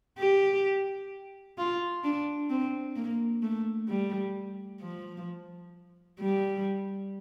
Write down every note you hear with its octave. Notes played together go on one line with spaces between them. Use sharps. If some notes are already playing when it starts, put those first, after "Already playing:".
G4
F4
D4
C4
A#3
A3
G3
F3
G3